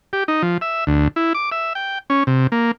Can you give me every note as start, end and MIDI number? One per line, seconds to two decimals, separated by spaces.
0.13 0.24 67
0.28 0.42 63
0.42 0.58 53
0.61 0.84 76
0.87 1.08 38
1.16 1.33 64
1.34 1.50 86
1.52 1.73 76
1.75 1.98 79
2.10 2.24 61
2.27 2.47 48
2.52 2.71 58